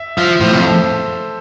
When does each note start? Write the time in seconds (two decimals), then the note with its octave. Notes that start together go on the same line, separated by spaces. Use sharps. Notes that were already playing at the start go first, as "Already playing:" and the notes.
Already playing: E5
0.17 F3 E5
0.40 A2 C5
0.53 F2
0.64 A4